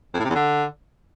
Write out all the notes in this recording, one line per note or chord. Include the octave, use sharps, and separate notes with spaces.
F2
A2
C3
E2
D3